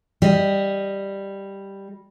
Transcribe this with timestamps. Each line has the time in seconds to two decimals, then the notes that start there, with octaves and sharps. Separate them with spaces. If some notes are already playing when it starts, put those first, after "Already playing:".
0.22 G3 D#5